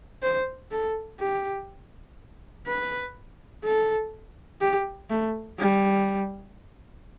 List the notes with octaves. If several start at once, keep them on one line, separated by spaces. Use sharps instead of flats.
C5
A4
G4
B4
A4
G4
A3
G3